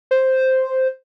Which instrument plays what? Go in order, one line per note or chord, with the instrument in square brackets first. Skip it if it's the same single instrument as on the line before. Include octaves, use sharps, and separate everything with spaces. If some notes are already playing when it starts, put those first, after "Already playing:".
[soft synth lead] C5